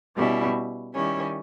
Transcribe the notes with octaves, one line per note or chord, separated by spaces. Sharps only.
B2 G3 C#4 E4
D#3 G3 C#4 E4